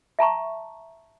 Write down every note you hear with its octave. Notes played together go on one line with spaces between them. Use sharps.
E5 A5 A#5 C#6